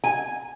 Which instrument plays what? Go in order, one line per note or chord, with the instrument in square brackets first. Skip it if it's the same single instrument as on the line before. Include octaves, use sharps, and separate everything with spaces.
[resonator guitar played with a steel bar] G#5